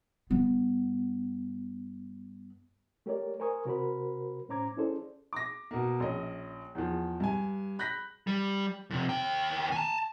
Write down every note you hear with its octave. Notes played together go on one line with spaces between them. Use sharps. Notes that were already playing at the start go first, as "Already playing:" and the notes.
G2 B3
A3 G4 A#4 C#5 D5
A#4 C5 G#5 C#6 D#6
C3 F#4 A#4 C5 B5
A2 C#4 C5 A#5 D6 G#6
C#4 E4 G#4 A4 C5 D5
D6 A#6
B2 A#3
A#1 C#4 D#5
E2 F3
G2 G#5
B5 F#6 G6 A#6 B6
G3
F2 C3
D#2 G5
G#5 A5